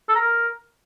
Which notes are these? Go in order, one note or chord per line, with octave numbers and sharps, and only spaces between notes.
A4
A#5
A#4